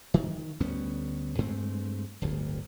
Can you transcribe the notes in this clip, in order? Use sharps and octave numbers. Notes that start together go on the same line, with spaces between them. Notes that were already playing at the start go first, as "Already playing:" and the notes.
D#3
D2 G3 B3 C#4
G2 G#3 A3 C4
D1 G1 D2